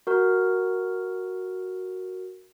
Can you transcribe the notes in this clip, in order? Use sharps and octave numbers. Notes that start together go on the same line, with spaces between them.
F#4 A#4